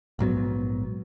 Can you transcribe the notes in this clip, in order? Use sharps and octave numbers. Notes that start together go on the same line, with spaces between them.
A#1 G#2 F#3 B3